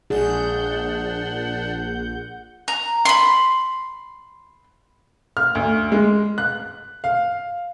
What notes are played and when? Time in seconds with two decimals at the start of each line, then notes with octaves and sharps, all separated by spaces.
0.10 A#1 D4 G#4 F#5 G6
2.68 A#5
3.05 B5 C6
5.37 F6
5.55 D2
5.92 G#3
6.38 F#6
7.04 F5